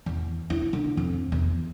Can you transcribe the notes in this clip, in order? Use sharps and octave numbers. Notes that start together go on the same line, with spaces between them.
E2
E4
D3
F2
E2